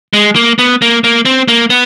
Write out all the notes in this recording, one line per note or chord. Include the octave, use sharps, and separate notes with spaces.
G#3
A#3
B3
A#3
A#3
C4
A#3
B3